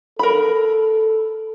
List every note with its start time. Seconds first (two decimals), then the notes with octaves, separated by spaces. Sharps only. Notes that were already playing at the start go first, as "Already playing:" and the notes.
0.19 A4 A#4 B5